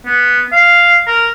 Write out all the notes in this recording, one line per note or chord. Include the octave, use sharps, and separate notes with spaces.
B3
F5
A#4